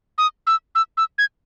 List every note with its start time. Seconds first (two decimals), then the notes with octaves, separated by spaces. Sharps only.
0.18 D#6
0.47 E6
0.75 E6
0.97 E6
1.18 G#6